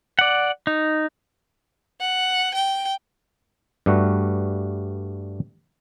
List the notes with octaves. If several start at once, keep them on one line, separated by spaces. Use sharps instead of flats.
D5 F#5
D#4
F#5
G5
G2 G3 A3 F#4